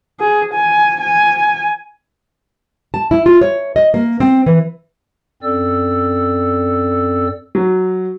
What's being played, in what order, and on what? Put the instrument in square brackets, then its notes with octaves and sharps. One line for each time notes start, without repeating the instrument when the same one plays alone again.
[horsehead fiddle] G#4
G#5
G#5
[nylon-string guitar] A5
E4
F4
C#5
D#5
A#3
C4
E3
[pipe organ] F#2 C4 A4 D5 E6
[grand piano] F#3